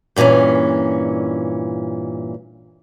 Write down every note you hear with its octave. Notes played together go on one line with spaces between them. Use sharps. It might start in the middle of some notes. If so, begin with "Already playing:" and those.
G2 A#2 D#3 E3 C#4